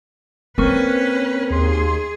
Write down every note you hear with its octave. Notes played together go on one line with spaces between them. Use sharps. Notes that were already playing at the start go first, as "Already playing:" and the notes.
A#3 C4 C#4 A#4 B4 C#6
D#2 G#4 C6